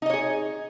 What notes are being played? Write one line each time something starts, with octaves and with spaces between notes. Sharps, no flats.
D#4 G#4 C#5 D#5